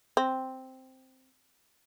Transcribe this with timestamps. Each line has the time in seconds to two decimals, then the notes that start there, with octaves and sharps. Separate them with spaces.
0.17 C4